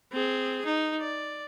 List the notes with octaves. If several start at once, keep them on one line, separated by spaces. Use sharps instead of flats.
C4 G#4
D#4
D5